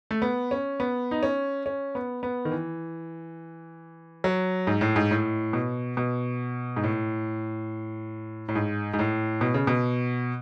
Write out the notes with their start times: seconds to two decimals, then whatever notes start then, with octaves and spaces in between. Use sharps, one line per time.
0.11 A3
0.22 B3
0.51 C#4
0.80 B3
1.11 D#4
1.23 C#4
1.66 C#4
1.95 B3
2.23 B3
2.45 D#3
2.51 E3
4.24 F#3
4.67 G#2
4.81 A2
4.96 G#2
5.11 A2
5.53 B2
5.97 B2
6.76 G#2
6.84 A2
8.49 A2
8.55 G#2
8.94 G#2
8.99 A2
9.41 B2
9.54 C#3
9.67 B2